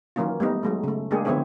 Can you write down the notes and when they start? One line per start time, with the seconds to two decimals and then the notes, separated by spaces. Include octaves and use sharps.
0.16 D#3 E3 F#3 A#3 C#4 F4
0.40 G3 A3 B3 D#4
0.63 F#3 G#3 A3
0.84 C#3 A3
1.11 G#3 A#3 D4 G4 G#4
1.25 D3 F3 B3 C4 E4 C#5